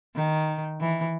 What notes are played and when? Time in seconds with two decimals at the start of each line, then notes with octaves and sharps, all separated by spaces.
0.16 D#3
0.81 E3